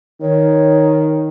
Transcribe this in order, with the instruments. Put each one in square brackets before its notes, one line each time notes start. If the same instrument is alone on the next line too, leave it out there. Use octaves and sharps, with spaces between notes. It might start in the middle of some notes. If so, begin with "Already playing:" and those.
[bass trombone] D#3 [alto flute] C#5